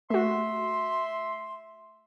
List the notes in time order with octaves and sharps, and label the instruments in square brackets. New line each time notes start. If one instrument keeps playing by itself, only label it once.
[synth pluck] A3 F#4 [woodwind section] E5 C6